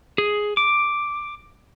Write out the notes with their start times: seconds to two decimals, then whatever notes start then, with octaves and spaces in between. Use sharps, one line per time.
0.18 G#4
0.57 D6